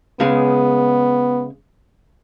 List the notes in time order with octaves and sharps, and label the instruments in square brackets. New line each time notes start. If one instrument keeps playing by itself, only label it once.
[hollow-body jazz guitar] C#3 G#3 [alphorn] B3